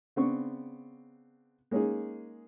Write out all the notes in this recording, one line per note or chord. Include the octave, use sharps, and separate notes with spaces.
C#3 B3 C4 D4 C#6
G#3 A#3 C#4 D#4 G#4